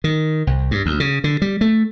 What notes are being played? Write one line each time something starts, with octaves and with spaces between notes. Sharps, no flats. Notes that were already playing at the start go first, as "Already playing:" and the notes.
D#3
C2
G2
D2
C#3
D3
G3
A3